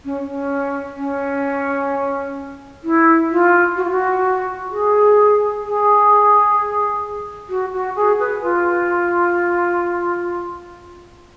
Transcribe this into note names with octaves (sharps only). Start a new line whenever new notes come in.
C#4
C#4
C#4
E4
F4
F#4
F4
F#4
G#4
G#4
F#4
F#4
G#4
B4
F4